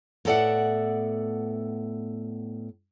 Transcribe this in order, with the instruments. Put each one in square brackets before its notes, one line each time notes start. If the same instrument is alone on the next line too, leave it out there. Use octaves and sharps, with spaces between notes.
[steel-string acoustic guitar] A2 B3 A4 D5 E5 F#5